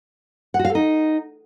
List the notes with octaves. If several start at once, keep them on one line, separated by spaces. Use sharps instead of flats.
F#5
F#4
F5
A4
D#4